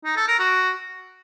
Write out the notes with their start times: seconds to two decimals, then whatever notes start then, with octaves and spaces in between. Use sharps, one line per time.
0.05 D#4
0.16 A4
0.28 A#4
0.39 F#4